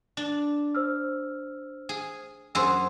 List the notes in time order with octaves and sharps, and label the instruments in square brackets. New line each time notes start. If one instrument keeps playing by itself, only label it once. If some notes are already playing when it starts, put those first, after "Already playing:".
[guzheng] D4
[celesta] C5 E6 F6
[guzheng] G#4
[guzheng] F#2 G#4 [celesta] C5 C6 E6